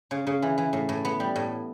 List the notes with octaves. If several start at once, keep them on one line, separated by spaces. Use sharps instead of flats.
C#3
C#3
E3
E3
A2
A2
B3
G3
A2